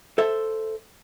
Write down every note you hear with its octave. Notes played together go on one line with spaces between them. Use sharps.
A4 C5 E5